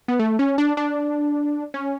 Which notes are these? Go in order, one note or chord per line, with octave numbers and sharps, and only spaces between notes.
B3
A3
C#4
D4
D4
C#4